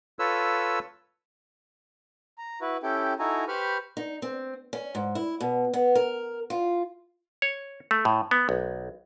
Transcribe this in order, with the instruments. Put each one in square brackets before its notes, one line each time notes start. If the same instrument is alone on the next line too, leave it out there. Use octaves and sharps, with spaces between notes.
[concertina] F4 A4 B4 C#5 E6
[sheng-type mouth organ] A#5
E4 F#4 B4
C#4 E4 G4 A4 G5
D#4 E4 F#4 A4 G#5 A#5
G4 B4 C5 B5 C#6 F6
[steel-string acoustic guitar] D#4
C4
C#4
G#2
E4
B2
B3
A#4
F4
[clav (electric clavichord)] C#5
A3
A2
B3
B1